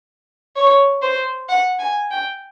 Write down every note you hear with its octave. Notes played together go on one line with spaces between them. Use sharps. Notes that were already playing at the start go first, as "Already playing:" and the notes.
C#5
C5
F#5
G#5
G5